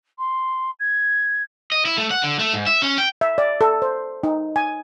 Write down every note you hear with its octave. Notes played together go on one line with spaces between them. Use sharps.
C6
G#6
D#5
E4
A3
F#5
D3
A3
G#2
E5
C#4
G5
E5
D5
A4
C5
D#4
G#5